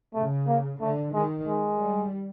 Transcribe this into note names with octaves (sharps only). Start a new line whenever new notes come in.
C#3 A3
A#3
D3 A3
D#3 G#3
G#3
G3